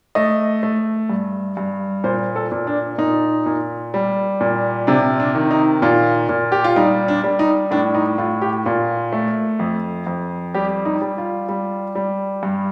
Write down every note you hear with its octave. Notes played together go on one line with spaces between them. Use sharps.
A3 D#5
A3
G2
G2
A#2 C5
A4
A#2
D4
A#2 D#4
A#2
G3
A#2
C3 D4
D4
D#3
D#4
A#2 F4
A#2
G4
F4
G3 D#4
D4
G3
D#4
A2 D4
D#4
A2 F4
G4
A#2 F4
A3
F2
F2
G3 G4
D#4
G3
F4
G3
G3
G2